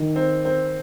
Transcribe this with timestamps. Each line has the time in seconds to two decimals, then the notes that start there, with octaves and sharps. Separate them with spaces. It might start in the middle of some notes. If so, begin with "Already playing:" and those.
Already playing: D#3
0.16 C4
0.45 C4